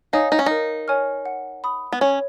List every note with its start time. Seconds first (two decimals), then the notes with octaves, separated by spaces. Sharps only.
0.13 D#4 C#5 F5 G#5 D#6
0.32 D#4
0.39 C#4
0.46 D#4 A#4
0.88 C#5 G#5 C#6 F6
1.26 F#5
1.64 B5 D#6
1.92 B3
2.01 C#4 C#5